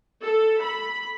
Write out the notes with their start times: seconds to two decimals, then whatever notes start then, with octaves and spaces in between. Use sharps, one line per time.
0.23 A4
0.61 B5